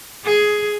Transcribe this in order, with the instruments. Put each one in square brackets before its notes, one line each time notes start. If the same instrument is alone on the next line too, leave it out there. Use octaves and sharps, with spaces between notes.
[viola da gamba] G#4